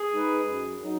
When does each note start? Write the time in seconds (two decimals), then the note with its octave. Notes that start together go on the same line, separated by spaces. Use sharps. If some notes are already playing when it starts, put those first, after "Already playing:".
Already playing: G#4
0.13 G#3 D#4 B4
0.47 F#2
0.83 F#3 D#4